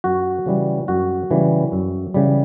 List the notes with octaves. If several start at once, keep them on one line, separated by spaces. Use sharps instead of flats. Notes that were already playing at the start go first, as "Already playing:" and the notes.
F#2 F#4
C#3 E3 G3
F#2 F#4
C#3 E3 G3
F#2
C#3 E3 G3